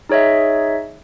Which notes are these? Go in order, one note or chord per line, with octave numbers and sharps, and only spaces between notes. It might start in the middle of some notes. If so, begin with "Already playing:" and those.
D#4 G#4 C#5 D#5 E5